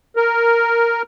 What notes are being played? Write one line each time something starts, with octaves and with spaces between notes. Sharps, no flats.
A#4